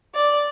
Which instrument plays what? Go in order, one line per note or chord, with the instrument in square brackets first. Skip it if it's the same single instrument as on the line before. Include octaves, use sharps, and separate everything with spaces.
[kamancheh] D5